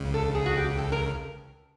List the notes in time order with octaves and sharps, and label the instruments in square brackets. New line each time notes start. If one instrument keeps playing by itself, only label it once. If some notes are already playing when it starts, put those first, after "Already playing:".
Already playing: [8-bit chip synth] C#2 C#3
[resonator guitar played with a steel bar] A4
G#4
F#4
G4
A4
A#4